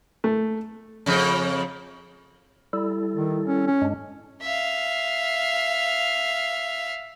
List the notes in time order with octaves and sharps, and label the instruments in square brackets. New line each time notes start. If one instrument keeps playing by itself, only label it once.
[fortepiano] A3
[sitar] F2 C#3
[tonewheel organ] G3 E4 A4
[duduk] D#3
C#4
C#4
[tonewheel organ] G2 G#3 D4
[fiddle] E5 F5